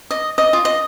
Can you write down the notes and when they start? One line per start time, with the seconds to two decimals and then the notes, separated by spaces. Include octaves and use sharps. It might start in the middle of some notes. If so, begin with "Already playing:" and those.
0.11 D#5
0.38 D#5
0.53 F4
0.65 D#5